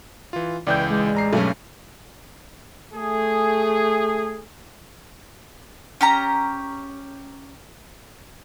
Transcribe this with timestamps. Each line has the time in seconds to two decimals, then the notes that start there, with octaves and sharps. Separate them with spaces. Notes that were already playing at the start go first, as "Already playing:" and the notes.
0.33 E3 F4
0.67 C#2 E3 D5 G5 G6
0.90 G#3
1.14 A1 A#5 C7
1.33 B1 G2 A3 C#4
2.93 A3 G#4
6.01 C#4 G4 A#5